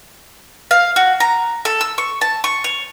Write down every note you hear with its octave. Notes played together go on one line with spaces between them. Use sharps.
F5
F#4
A#5
A4
E6
C#6
A5
C#6
C#5